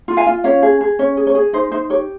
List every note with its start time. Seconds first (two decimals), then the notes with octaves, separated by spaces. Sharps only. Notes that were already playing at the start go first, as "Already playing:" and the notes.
0.08 F4
0.17 F5 G#5
0.27 F4
0.44 C#4 C#5 F5
0.63 G#4
0.81 G#4
0.99 C#4 C#5
1.17 G#4
1.27 C#5
1.35 G#4
1.53 D#4 C5
1.72 D#4 C5
1.90 G4 C#5